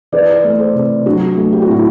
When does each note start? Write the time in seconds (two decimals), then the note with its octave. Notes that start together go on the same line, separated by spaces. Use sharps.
0.12 E3 B4 D5
0.44 A3
0.59 A4 C5
0.74 C3
1.06 F#3 D4 F#4
1.37 A3
1.52 G4
1.62 F#4
1.68 A2 E4